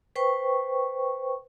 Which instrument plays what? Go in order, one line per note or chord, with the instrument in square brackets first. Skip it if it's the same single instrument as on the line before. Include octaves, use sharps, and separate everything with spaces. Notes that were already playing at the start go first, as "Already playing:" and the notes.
[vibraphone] B4 C5 G5 C#6